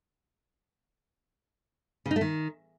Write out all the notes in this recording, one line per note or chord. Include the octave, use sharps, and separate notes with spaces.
C#3
D#4
A3
D#3